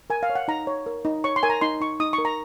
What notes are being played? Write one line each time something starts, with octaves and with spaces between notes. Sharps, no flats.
A#4 G#5
F5
C#5
F#5
D#4 A#5
C#5
A#4
D#4
C#5 C#6
C6
A#4 G#5
A#5
D#4 C6
D#4 C#6
D#4 D#6
C#6
A#4
A#5